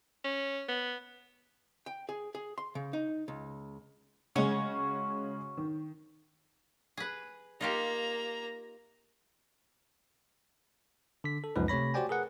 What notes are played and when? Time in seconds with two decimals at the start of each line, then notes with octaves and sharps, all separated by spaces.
0.24 C#4
0.69 B3
1.86 G5
2.09 G#4
2.35 G#4
2.58 C6
2.75 C#3
2.93 D#4
3.28 C#2
4.36 C#3 G#3 C#4 F#4 C#5
5.57 D#3
6.97 G#4 B4
7.61 A#3 D#4 F4 G4 A#5
11.24 D3 B6
11.44 A4
11.56 C#2 F#2 F3 G#3 D#4 B4
11.68 C3 A3 C#5 B5 A#6
11.94 F#4 G4 C5 D5 G5 G#5
12.09 G#4 A#4 B4 F#5